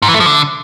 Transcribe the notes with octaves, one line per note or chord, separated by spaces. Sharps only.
G#2
E3
A3
F3
D3